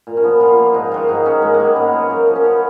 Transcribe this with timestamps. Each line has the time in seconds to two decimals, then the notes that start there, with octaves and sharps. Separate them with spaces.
0.07 A#2
0.17 C#4
0.24 F3 B3
0.40 A#2 F4
0.57 F3 A#3
0.74 G#2 D#4
0.91 D#3 F#3 F4
1.09 G#2 D#4
1.25 D#3 F#3 C#4
1.42 G#2 G#3
1.54 A#3
1.60 F#3
1.65 B3
1.76 G#2 C#4
1.92 F#3 F4
2.10 F#2 A#4
2.27 F3 D#4
2.35 C#4
2.44 F#2 B3